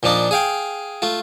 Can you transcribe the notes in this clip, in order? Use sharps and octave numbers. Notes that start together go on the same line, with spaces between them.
A#2 F3 D4 D#4
G#4 F5 G5
A3 F4